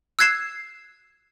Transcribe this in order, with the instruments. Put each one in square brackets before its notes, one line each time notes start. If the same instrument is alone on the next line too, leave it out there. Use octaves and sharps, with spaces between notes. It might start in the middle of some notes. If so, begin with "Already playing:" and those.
[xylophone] E6 F#6 G#6 C7 E7